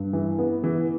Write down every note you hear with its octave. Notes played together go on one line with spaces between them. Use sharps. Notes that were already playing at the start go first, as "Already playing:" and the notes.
Already playing: G2
E3
B3
E3